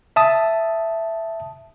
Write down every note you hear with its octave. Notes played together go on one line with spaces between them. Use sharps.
E5 A5 D#6